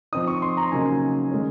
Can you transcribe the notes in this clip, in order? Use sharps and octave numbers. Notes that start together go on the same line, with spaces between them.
F3 C4 D#4 D#6
C#6
C6
A#5
C#3 F#3 A#3 D#4 G#5
D#3 G#3 C#4